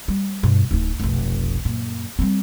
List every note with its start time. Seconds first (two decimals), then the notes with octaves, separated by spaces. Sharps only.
0.08 G3
0.43 G2 B2
0.71 D1 D#4
1.00 F1 B1
1.65 F#2 A#2
2.19 G3 C4